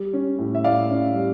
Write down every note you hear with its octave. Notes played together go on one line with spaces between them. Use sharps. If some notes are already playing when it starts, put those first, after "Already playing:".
Already playing: G3
C#4
A2
E5
A2 D5 F5
C#4
G3